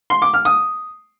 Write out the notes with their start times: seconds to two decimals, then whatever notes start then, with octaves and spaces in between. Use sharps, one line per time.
0.10 C6
0.22 D6
0.34 F6
0.45 D#6